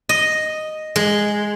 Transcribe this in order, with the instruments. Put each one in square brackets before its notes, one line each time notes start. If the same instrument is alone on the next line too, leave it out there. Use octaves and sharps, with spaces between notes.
[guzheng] D#5
G#3